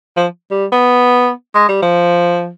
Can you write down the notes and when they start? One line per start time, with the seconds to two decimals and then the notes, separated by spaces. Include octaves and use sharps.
0.17 F3
0.51 G3
0.72 B3
1.55 G#3
1.69 G3
1.83 F3